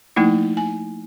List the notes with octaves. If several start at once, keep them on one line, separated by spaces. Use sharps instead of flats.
F3 A3 A#3 D#4 E4
G#5